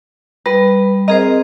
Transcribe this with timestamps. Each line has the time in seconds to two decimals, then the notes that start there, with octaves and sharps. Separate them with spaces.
0.46 G3 B4
1.08 C4 G#4 A#4 C5 D#5